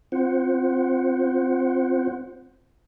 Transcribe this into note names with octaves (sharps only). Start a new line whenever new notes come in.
C4 F4 C5 F#5